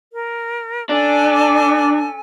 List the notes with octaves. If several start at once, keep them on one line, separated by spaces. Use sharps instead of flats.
A#4
C#4 D4 A4 G#5